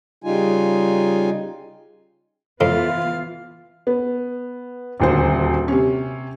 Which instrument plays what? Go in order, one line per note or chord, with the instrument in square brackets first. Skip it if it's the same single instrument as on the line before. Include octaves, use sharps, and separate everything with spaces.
[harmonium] C#3 G3 D#4 F4 G#5
[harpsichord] F2 [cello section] E3 B3 F4 [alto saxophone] F5
[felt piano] B3
D#1 D2 C5
C3 C#4